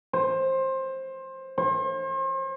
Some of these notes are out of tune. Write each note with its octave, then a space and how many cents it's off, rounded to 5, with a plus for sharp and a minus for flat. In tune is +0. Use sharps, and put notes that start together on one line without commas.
C5 +20
C5 +40